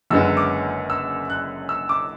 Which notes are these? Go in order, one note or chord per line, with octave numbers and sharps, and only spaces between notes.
F#1 F#2 D3 G#3 B3 E6
D6
E6
F#6
E6
D6